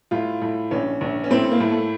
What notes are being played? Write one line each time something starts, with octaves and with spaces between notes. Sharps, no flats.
A2 F4
A2
A#1 C#4
A#1
C#4
A2 C4
A#3
A2
A3